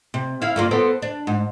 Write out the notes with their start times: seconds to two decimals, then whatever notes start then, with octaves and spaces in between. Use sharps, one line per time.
0.14 C3
0.42 E4 F5
0.56 G2 A#3 F4
0.71 B3 C4 A4
1.02 D4
1.27 G#2